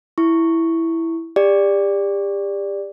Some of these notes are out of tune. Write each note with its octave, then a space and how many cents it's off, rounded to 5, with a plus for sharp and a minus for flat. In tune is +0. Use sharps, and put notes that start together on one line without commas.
E4 +0 C#6 +0
G4 +35 D5 +0